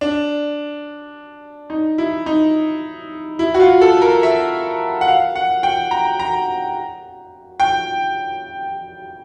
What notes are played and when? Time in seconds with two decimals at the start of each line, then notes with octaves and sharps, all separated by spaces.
0.01 D4
1.70 D#4
1.98 E4
2.26 D#4
3.39 E4
3.54 F#4
3.60 F4
3.81 A4
4.02 A#4
4.23 E5
5.01 F#5
5.08 F5
5.36 F#5
5.63 G5
5.91 A#5
6.19 A#5
7.60 G5